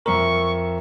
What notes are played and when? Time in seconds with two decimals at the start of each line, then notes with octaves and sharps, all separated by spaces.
0.06 F2 A#4 E5 A#5 C#6